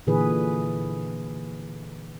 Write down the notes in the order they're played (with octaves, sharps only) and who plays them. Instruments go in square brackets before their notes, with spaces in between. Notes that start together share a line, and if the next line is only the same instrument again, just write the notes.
[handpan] A#2 D3 E3 G#4 B4